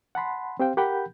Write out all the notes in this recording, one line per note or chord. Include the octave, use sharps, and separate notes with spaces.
F#5 A5 B5 C6
C4 G4 C5 F5 G5
G4 A#4 F#5 G5 B5 G6